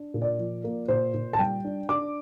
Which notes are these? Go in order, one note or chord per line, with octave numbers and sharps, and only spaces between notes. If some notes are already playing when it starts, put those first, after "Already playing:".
Already playing: D4
A#2
D5
F3
A#3
A#2 C5
A#2
A5
G3 G5
D4
D4 D6